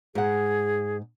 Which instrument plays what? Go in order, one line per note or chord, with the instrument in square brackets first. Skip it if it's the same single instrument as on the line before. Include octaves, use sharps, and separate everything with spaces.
[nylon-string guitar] G#2 F#5 [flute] G#4